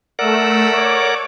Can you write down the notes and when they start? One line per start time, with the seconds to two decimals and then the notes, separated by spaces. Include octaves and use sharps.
0.19 A3 A#4 D5 F#5 E6
0.73 C#5 D6